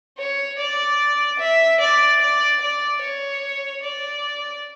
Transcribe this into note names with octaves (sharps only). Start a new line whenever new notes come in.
C#5
D5
E5
D5
D5
D5
C#5
D5